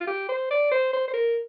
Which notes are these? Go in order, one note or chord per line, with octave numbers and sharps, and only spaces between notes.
F4
G4
C5
D5
C5
C5
C5
A#4